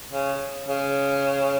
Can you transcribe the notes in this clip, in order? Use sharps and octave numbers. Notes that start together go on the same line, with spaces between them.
C#3
C#3